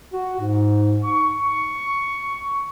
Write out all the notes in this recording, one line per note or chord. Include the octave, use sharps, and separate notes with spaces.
F#4
G#2
C#6